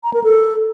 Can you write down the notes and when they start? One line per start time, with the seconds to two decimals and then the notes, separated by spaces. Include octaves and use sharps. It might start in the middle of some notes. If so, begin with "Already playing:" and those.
0.04 A#5
0.14 A#4
0.24 A4